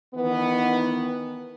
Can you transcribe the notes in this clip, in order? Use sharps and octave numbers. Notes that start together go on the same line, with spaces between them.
D#3 E3 B3